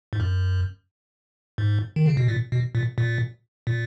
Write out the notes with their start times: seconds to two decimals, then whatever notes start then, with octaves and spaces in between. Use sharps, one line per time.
0.13 G#2
0.20 F#2
1.58 G#2
1.96 D#3
2.06 C#3
2.17 B2
2.28 A#2
2.52 B2
2.75 A#2
2.98 A#2
3.67 A#2